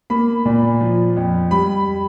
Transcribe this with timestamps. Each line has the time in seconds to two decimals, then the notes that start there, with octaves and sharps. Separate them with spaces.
0.10 A#3 B5
0.45 A#2
0.81 F3
1.16 F2
1.51 G3 B5